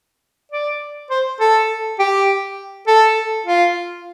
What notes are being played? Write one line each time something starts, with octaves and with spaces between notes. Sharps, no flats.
D5
C5
A4
G4
A4
F4